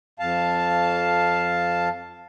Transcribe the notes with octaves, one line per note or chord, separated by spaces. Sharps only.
F2 F5 A5